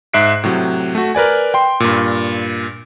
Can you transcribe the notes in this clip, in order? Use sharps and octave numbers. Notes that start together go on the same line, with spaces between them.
G#2 E5 F#6 C7 D7
A2 C3 F#3
A3 F#4
A#4 B4 D5 G#5
G5 C6
G2 A#2